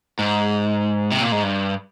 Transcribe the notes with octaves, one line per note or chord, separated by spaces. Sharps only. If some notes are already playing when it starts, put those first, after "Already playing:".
G#2
C3
A#2
G#2
G2